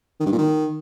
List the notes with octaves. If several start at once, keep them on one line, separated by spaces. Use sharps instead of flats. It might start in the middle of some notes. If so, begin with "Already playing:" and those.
D#3
G2
A#2
D#3